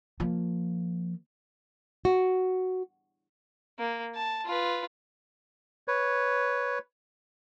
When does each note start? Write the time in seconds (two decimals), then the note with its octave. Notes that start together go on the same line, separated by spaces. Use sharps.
0.20 F3 A#3
2.05 F#4
3.79 A#3
4.15 A5
4.45 F4 B4
5.88 B4 C#5